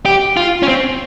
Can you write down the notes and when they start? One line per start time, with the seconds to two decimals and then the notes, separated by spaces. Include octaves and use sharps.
0.06 G4
0.37 F4
0.63 C#4
0.68 C4